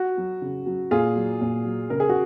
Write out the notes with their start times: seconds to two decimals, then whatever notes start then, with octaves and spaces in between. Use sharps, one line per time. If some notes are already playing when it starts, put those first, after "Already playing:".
Already playing: F#4
0.17 F#3
0.42 C#3
0.66 F#3
0.91 A#2 F4 G#4
1.16 F#3
1.41 A#2
1.65 F#3
1.90 C#3 A#4
2.00 G#4
2.09 F#4